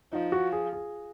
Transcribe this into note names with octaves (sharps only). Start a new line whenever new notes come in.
F3 D#4
F#4
G#4
G#4